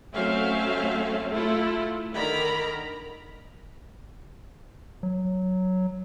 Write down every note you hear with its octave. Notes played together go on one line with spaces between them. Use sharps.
F#3 A3 C4 C#4 E5 F5
A3 E4 F4 A4
D3 D#3 A#4 A#5 B5
F#3